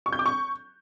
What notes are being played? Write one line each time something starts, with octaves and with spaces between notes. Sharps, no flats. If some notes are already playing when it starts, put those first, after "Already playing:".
C#6
G6
D6
C#6